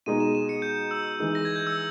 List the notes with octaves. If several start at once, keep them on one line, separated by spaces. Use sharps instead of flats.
B2 G#3 D#4 D#7
E7
E7
C#7
G6
E6
E3 G#3 D#4
A#6
G#6
G6
E6